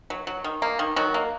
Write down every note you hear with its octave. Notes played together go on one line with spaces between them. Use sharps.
F#3
F#3
D#3
A#3
D#3
D#3 F#3 F#4
A#3